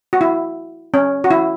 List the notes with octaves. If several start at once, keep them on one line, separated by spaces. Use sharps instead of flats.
F#4
E4
C#4
F#4
E4